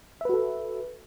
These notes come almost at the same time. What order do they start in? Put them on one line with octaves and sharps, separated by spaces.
E5 B4 F#4 A4